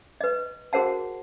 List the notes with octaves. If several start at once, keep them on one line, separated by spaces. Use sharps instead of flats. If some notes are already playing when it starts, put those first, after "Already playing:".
B4 D#5
F#4 G#4 A#4 C5 F#5 A5